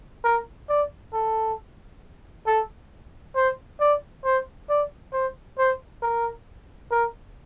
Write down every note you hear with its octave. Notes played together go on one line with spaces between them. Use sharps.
A#4
D5
A4
A4
C5
D5
C5
D5
C5
C5
A#4
A#4